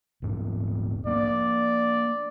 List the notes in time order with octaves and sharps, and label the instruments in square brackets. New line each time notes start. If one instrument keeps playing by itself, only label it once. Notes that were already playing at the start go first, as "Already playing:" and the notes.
[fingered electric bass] D#1 G#2
[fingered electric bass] A#3 C4 D4 [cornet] D5